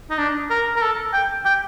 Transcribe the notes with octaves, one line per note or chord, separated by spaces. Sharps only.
D#4
D4
A#4
A#4
A4
G5
G5